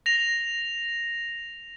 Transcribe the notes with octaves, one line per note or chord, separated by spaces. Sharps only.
A#6 F7